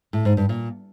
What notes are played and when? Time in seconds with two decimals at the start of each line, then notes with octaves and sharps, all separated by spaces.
0.13 A2
0.25 G#2
0.37 G2
0.49 A#2